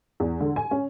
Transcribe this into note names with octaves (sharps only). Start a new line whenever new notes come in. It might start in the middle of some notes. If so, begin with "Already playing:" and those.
E2
D3
G#5
C#4